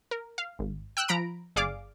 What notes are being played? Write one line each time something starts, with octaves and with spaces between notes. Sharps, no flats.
A#4
F5
G#1
G5 E6 F#6
F3 A#5 B5 D7
G1 G#4 D5 F5 D6